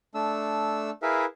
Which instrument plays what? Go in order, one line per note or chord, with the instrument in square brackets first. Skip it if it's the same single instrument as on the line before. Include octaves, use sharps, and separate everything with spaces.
[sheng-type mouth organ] A3 D4 E6
E4 G#4 A#4 B4 E5 F5